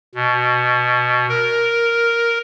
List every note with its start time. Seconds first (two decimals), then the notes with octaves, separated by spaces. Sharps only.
0.15 B2
1.29 A#4